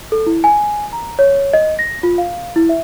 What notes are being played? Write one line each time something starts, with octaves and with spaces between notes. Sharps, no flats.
A4
E4
G#5
A#5
C#5
D#5
A#6
F4
F5
E4
E5